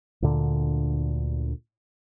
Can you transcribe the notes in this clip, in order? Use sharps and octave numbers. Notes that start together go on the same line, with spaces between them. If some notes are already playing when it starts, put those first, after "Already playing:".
D2 A#2 D3